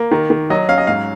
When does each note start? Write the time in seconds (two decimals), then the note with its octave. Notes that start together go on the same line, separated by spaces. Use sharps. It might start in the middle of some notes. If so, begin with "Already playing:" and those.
Already playing: A#3
0.11 D#3
0.30 D#3
0.50 F#3 D#5
0.69 C#4 F5
0.78 D#5
0.87 G#2 F5